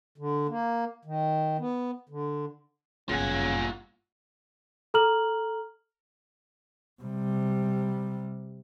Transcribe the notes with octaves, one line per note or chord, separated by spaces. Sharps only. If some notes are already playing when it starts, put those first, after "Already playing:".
D3
A#3
D#3
B3
D3
G1 F#2 A#2 C#3 F4 F#5 G#5
A4 A#5 F6 F#7
C3 G3